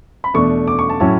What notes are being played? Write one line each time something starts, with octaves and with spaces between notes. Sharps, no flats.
B5
E2 B2 A3 D4 C#6
D6
C#6
A5
A2 F#3 C#4 E4 A5